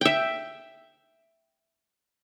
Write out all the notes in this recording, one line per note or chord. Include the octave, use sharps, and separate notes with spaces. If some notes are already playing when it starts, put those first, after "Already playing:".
E5 G5